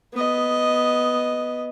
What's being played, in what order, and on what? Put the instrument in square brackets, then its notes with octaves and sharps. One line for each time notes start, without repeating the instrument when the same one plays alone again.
[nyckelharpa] B3 D#5